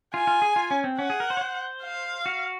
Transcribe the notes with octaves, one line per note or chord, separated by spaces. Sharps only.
F4 G#5
F4
G#4
F4
C#4
C4
C#4 F#5
G#4
A#4
C5
C#5
C5
F5
F#4